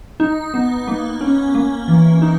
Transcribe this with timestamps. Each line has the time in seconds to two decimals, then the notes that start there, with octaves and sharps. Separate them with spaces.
0.20 D#4
0.54 B3
0.88 A#3
1.21 C#4
1.55 A#3
1.88 E3
2.22 D#4